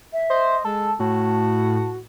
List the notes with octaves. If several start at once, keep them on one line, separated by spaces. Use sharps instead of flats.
E5
C5 D#5
G#3 A4 A5
A2 F#4 A5